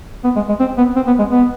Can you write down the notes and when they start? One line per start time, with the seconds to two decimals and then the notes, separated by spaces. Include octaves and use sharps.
0.24 B3
0.36 G#3
0.49 G#3
0.60 C4
0.78 B3
0.96 C4
1.07 B3
1.19 G#3
1.31 B3